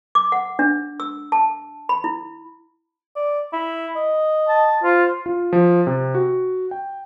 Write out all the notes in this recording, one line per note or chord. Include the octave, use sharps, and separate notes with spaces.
D6
F#5
D4
E6
A5
B5
E4
D5
E4
D#5
A5
F4 C5
F4
F3
C3
F#4
G5